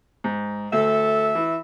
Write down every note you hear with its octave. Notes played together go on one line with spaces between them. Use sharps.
G#2
D2 A4 E5
E3